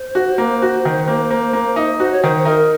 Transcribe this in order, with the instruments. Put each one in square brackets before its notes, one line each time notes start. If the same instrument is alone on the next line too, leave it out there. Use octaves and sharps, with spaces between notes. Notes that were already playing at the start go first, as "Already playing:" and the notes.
Already playing: [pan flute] C5
[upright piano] F#4
A#3
F#4
D#3
A#3
A#3
A#3
D#4
[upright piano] F#4 [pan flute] C5
[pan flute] C#5
[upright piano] D#3 [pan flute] C5
[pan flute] C5
[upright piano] D#4 [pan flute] A#4